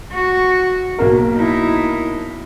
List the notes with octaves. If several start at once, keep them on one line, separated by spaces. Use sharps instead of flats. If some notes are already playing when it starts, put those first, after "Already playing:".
F#4
B1 A#3 A#4
D#4 E4